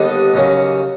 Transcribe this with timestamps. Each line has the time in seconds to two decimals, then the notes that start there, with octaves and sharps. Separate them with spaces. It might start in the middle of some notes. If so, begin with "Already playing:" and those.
Already playing: D#2 D3 G3 B3 D4 D#5
0.34 D#2 C#3 F#3 A#3 C#4